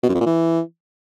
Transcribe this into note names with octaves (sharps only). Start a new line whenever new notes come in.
B2
F#2
F2
A#2
E3